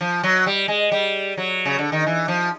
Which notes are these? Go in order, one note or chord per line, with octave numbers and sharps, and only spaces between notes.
F3
F#3
G3
G#3
G3
F#3
C#3
D3
D#3
E3
F3